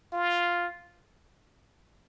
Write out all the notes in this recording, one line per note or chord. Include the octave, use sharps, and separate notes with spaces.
F4